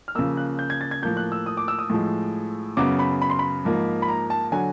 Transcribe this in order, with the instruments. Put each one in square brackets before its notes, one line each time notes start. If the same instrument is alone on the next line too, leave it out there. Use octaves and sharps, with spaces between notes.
[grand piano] F6
C#3 F3 A#3 E6
F#6
G6
G#6
A6
G#6
A2 F3 A#3 G6
F#6
E6
D#6
D6
E6
D#6
A2 F3 G#3
F#2 C#3 F#3 B3 D6
B5
B5
C6
B5
G#2 F3 A#3
B5
A#5
A5
D3 F#3 G#5